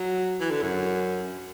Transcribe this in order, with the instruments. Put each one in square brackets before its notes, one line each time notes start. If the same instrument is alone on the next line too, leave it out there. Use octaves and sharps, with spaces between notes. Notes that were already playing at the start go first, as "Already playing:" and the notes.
Already playing: [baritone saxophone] F#3
E3
D3
F#2